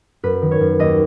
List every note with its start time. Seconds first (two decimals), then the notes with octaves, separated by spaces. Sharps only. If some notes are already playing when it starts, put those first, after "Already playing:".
0.23 F#2 B4
0.42 D#3
0.51 C#5
0.61 F#2
0.79 D#2 D#5